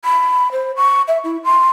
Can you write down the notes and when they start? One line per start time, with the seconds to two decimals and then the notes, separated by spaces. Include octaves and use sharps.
0.05 B5
0.52 C5
0.76 C#6
1.08 E5
1.24 E4
1.44 C6